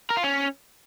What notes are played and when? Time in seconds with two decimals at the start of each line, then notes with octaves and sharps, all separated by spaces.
0.10 A#4
0.17 F4
0.23 C#4